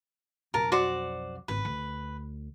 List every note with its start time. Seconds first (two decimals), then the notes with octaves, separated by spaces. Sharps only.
0.54 B1 F2 A#4 A5
0.72 F#4 C5 D5
1.48 G#1 D2 B4
1.65 D2